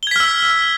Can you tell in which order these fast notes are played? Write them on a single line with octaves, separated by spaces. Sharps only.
G7 G#6 B6 F6 E6